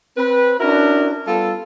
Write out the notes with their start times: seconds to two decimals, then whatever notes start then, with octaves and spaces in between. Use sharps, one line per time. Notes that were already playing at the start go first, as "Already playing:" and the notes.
0.16 C4 B4
0.59 C#4 D4 E4 F#4 A#4
1.26 G3 B3 F4 A4